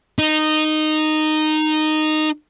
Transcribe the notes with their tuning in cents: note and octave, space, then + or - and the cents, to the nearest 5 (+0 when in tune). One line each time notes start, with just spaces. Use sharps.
D#4 -10